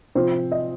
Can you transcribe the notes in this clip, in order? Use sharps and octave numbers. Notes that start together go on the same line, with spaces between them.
C3 F3 C4 F4 C5
D#5